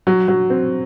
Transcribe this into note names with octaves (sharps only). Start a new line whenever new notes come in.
F#3
F#3
C4